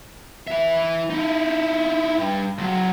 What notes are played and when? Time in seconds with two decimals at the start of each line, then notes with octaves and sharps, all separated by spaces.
0.47 E3 E5
1.10 D#4 E4
2.18 G2
2.58 C#2 F#3